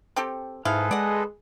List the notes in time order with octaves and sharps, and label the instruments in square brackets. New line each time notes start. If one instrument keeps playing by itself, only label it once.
[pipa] C4 G4 A4
[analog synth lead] G#2 [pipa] E4 F5 [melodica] G#4 A4 B4
[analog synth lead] G#3 [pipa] D5 F#5